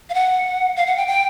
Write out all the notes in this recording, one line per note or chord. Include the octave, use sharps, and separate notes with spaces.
F5
F#5
F5
F#5
G5
G5